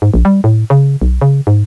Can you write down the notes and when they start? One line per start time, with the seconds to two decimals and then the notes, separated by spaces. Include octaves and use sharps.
0.02 G#2
0.14 A#1
0.25 G3
0.44 A2
0.70 C#3
1.02 B1
1.21 C#3
1.47 G#2